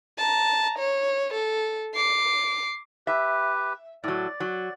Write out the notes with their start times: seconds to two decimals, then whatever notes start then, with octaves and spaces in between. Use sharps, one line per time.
0.18 A5 A#5
0.78 C#5
1.33 A4
1.94 D6 C7
3.07 G4 B4 E5
4.04 A2 F#3 D5
4.40 F#3